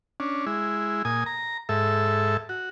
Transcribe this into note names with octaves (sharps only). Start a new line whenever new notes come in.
C#4 D4
G#3 E4
A#2 G#5 D#6
A#5
G#2 A4 E5
F#4